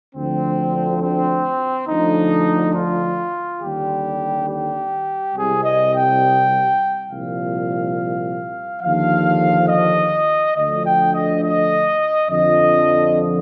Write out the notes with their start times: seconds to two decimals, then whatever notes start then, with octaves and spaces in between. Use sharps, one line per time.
0.14 D2 D3 F3 C4
1.01 C4
1.88 D2 D3 F3 D#4
2.75 F4
3.61 D#2 D3 G3 G4
4.48 G4
5.34 C2 C3 G3 G#4
5.64 D#5
5.93 G5
7.08 C2 A#2 F3 F5
8.82 D#2 D3 F3 F5
9.68 D#5
10.55 D2 D3 F3 D#5
10.85 G5
11.13 D#5
11.43 D#5
12.29 F2 D3 F3 D#5